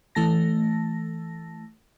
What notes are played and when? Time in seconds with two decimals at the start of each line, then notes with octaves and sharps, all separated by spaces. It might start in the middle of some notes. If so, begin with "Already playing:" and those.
0.15 E3 A3 A5 A#6